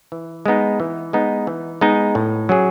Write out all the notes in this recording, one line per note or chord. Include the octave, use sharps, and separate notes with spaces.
E3
G#3 B3 D#4
E3
G#3 B3 D#4
E3
G#3 B3 D#4
A2
F#3 C#4 G#4